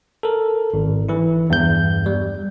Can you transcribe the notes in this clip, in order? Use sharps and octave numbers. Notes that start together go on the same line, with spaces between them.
A4 A#4
G#1
E3 E4
E2 G2 G6
G3